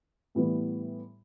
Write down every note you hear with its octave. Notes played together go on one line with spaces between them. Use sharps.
A2 E3 G3 B3